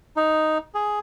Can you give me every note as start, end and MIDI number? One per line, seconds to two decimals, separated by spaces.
0.17 0.58 63
0.75 0.99 68